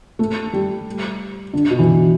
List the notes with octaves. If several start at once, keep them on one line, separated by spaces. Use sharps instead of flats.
A3
G3
D3
B2
E3